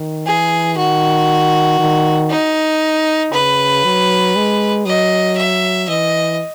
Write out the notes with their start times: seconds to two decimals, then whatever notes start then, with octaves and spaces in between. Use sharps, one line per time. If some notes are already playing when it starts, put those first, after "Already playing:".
Already playing: D#3
0.26 E3 G#4
0.77 D#3 F#4
1.79 D#3
2.30 D#4
3.33 C#3 B4
3.84 F#3
4.35 G#3
4.86 F#3 D#5
5.37 E5
5.88 E3 D#5